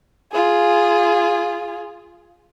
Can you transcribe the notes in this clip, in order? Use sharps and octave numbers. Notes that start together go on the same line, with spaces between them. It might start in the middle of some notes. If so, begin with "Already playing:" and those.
F4 G#4